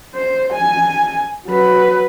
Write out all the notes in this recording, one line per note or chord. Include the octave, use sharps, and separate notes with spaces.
C5
G#5
F#3 B4